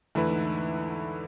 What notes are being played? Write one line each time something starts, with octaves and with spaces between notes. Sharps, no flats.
E2 D3 A3 E4 B4
G#2